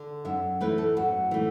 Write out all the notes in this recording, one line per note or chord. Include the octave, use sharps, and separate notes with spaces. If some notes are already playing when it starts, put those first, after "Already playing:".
Already playing: D3
F#2 E5
E3 A3 B4
A4
F#2 F#4
E3 A3